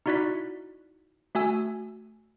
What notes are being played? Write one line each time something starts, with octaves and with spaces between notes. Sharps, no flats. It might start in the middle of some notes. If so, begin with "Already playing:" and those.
D#4 E4 F#4 D5 F#6 B6
A3 F#4 G#5 E6